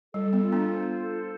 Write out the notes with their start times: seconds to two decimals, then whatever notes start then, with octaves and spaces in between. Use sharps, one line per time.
0.13 G3 A4
0.33 B3
0.42 F4
0.52 B3 D4
0.71 C5
1.00 A4